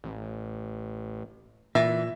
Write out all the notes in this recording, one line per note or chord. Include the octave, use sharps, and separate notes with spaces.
A1
A#2 E3 E5